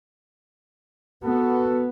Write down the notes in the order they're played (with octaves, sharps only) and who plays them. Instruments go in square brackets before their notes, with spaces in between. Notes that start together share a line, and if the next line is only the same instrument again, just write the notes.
[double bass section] B3 [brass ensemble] F#4 A4